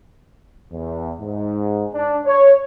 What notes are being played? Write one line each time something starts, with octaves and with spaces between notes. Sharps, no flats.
E2
G#2
D4
C#5